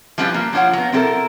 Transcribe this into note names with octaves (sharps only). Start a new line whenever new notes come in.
F3 G3 C#4 D4 F4 B4
A#3
F3 D4 F4 C#5 F#5
F#3 B3
C4 D4 E4 G4 A4 A#4